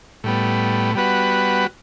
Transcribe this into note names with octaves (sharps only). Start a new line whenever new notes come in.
A2 G3 B3
G3 B3 F#4 B4